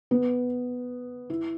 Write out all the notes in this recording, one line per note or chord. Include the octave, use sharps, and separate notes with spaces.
B3
E4